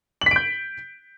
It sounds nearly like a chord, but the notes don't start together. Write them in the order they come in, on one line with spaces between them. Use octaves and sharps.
F#7 B6 D7 G6